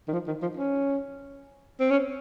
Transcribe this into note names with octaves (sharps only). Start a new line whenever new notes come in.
D#3
F3
D#3
F3
C#4
C4
C#4